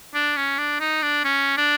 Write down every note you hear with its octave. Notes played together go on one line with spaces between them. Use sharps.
D4
C#4
D4
D#4
D4
C#4
D4